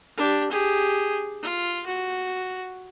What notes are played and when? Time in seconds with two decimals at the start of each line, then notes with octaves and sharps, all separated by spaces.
0.17 D4 G4
0.50 G4 G#4
1.42 F4
1.86 F#4